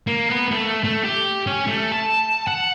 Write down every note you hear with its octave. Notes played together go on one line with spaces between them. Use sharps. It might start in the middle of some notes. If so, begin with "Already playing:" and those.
A#3
B3
A3
A3
G4
C#4
A3
A5
F#5